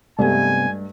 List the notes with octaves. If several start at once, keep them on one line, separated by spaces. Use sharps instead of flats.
G2 C3 G#3 A3 B3 G#5